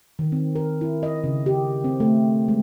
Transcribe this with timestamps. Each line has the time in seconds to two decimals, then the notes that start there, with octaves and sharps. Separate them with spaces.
0.19 D#3
0.32 C4
0.56 A#4
0.81 E4
1.03 D#5
1.24 C#3
1.46 G4
1.84 C4
2.00 A3
2.48 G#3